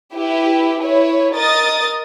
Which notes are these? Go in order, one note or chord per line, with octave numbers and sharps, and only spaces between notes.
E4 G4 B4
E4 B4 C#5
A#4 D#5 D#6 A6